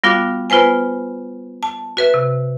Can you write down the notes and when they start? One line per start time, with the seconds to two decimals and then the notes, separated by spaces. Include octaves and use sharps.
0.04 G3 B3 F4 F#4 F5 D6
0.50 B3 F4 B4 C5 G#5
1.63 A5
1.97 F#4 B4 E5
2.14 C3